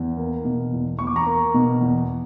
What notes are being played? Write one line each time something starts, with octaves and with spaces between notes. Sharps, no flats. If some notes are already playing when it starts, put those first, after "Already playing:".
Already playing: E2
A#3
B2
E2
E2 C#6
D6
A#5 C#6
A#3
B2
E2